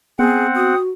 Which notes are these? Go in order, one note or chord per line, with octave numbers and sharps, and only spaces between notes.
B3 C4 G#4 F#5
F#4 D#6